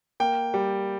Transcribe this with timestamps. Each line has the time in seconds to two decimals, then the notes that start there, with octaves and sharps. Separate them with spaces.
0.20 A#3 G5
0.54 G3